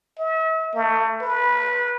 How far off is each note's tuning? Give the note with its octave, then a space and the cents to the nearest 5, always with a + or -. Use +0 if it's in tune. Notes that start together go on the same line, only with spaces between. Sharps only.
E5 -40
A3 +30
B4 -20